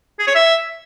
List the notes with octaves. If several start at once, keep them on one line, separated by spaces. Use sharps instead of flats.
G#4
C#5
E5